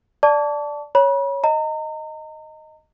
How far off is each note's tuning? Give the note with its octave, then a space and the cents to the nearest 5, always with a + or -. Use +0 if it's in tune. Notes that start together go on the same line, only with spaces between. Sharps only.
D5 +0 A5 +0 D6 -45
C#5 +0 B5 -40
D#5 +0 A#5 -35